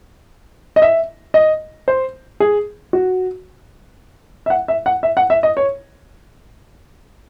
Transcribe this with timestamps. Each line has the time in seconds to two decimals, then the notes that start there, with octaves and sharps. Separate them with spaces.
0.76 D#5
0.82 E5
1.34 D#5
1.88 C5
2.40 G#4
2.93 F#4
4.46 E5
4.50 F#5
4.68 E5
4.86 F#5
5.03 E5
5.17 F#5
5.30 E5
5.43 D#5
5.57 C#5